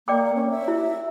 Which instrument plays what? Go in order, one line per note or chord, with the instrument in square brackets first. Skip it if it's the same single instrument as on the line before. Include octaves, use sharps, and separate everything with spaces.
[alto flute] A#3 [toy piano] D5 G5 D6
[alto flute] C#4
E5
[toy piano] E4